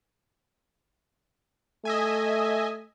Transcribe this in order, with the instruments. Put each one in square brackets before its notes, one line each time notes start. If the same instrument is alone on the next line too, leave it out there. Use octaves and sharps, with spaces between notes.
[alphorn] A3 [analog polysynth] D#5 E5 G#5